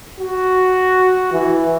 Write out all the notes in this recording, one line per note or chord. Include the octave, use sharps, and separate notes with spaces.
F#4
E3